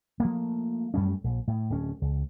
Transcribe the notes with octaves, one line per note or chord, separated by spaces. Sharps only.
F3 A3 A#3
F#2 G3 A3 C#4
A#1
A2
D1 C#4
C#2